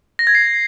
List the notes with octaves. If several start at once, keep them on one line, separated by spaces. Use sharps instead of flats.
A#6
G#6
C7